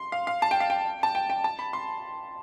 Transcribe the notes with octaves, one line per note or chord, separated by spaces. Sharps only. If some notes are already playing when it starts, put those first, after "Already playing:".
Already playing: C6
F5
F5
A5
G5
F5
G5
A5
G5
G5
A5
B5
C6